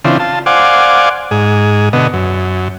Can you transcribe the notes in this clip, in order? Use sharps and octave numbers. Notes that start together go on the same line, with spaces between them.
C#3 E3 C4 D4 F4
F4 A5
C5 D5 F5 F#5 G#5 D6
G#2 G#4
B2 D3 B3 D#5
F#2